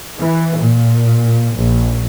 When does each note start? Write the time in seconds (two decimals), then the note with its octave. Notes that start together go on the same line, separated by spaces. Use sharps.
0.19 E3
0.58 A#2
1.55 A#1